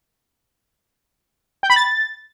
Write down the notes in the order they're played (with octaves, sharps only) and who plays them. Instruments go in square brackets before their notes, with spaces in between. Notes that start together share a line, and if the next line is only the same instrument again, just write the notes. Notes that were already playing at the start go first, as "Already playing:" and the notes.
[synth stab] G5
B5
A6